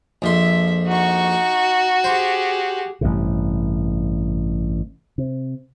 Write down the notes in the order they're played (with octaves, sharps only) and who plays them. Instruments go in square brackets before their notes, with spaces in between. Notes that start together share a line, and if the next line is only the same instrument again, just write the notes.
[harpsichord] A#1 F2 C6 [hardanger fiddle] E5
[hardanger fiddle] D#4 C#6 [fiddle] F#4
[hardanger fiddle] G4 G#4 [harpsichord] C5
[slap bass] A1 G2 C3
C3